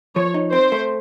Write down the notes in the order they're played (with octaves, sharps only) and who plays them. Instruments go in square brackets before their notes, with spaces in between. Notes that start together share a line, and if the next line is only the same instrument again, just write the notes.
[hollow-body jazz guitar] F3 [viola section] C#5
[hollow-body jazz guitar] D#4
[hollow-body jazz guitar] C4 [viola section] C5
[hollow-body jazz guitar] A3